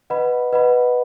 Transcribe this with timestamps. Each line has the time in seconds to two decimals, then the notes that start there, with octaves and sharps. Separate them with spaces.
0.10 B4 D#5 F#5 B5
0.53 B4 D#5 F#5 B5